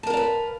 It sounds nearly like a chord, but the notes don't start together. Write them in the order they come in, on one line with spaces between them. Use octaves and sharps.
A5 A#4 F5 D5 B4